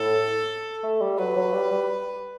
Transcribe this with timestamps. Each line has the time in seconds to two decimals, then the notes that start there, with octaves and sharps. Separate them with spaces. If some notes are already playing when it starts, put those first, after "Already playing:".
Already playing: A2 A4
0.84 A3
1.01 G3
1.18 F#3 B4
1.36 F#3
1.53 G3
1.71 G3